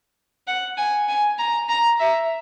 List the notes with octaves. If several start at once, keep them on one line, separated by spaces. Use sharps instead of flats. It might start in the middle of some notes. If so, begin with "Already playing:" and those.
F#5
G#5
G#5
A#5
A#5
E5